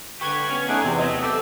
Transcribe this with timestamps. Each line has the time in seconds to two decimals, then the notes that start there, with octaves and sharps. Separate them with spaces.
0.21 D3 G4 B4 C#6 G#6
0.50 B3 C#4
0.68 A3 C#4 D#4 G#4 D5 F#5
0.83 E2 C3 B3 C4
0.98 F#3 A3 D#5
1.23 C4 G4 A4 E6